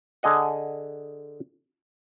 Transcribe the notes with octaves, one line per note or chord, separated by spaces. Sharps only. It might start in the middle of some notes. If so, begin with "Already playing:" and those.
D3 G#4 D#5 F#5